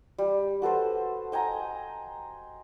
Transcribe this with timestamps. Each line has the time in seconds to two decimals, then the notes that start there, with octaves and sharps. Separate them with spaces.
0.18 G3
0.62 F#4 A4 B4 C5
1.32 D#5 G5 G#5 A#5